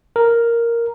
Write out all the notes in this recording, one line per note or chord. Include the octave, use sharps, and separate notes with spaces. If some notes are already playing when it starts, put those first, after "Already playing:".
A#4